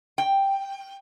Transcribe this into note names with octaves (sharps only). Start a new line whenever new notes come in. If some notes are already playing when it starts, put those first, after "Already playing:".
G5